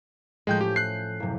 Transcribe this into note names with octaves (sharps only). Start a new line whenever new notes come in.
A2 F3 G#3 A3 G5 G6
C#4 G4
F#6 C7
F#1 C3